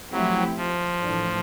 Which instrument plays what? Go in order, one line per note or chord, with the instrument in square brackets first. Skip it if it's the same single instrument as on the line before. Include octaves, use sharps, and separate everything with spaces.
[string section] F3 A3 C4 E4 G4 [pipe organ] F#3
[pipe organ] F3
[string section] A2 E3 A3 D4